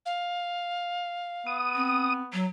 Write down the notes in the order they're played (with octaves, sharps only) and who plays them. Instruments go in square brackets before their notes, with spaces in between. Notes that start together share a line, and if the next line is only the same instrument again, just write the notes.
[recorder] F5
[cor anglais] B3 [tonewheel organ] D#6
[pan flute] C4
F#3